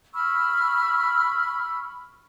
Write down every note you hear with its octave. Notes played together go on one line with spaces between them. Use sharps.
B5 C#6 E6 F6